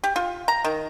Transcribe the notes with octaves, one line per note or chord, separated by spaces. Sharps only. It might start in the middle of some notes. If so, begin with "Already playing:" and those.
G4
F4
A#5
D#3